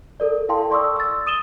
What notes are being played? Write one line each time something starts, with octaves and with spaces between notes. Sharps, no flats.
A4 A#4 D5
E4 A4 F5 G5 A5 C6
D5 C6 C#6 D#6 E6
E6 A6
D#6 D#7 E7 G7